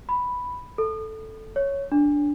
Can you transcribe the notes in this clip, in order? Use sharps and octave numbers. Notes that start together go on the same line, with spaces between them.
B5
A4
C#5
D4